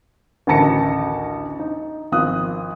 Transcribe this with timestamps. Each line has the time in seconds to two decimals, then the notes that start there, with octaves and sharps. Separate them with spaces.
0.47 A1 D2 D#3 A5 A#6 C#7
1.59 D#4
2.12 G#1 F3 D#6 F#6